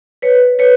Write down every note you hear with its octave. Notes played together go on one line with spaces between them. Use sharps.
B4 C#5
B4 C#5